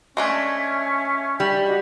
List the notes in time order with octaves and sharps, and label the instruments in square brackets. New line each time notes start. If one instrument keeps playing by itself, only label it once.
[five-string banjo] G#3 A3 D4 [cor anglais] C#4 [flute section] E5 G#5
[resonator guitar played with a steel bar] G3
[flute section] F#4 D5 D#5